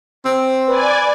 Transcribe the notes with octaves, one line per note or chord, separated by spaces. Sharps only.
C4
B4 D5 G#5